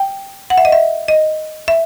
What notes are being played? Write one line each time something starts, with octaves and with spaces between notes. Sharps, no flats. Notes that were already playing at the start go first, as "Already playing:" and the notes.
Already playing: G5
F#5
E5
D#5
E5
D#5
E5